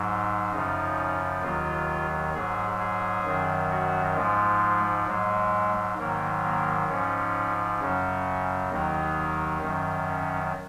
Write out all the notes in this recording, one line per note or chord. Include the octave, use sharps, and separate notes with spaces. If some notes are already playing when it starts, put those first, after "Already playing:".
Already playing: G#2 F#3
F#2 C#3 F3 D#4
D#2 D#3 F#3 F4
G#2 F#3 G#4
G#4
F#2 D#3 F#3
F#4
G#2 F3 G#3
G#2 F#3 G#3
G#2 D#3 F#3 A#3
A#3
G#2 F3 C#4
F#2 C#3 F#3 C#4
D#2 D#3 F#3 D#4
F#2 D#3 F#3
C#4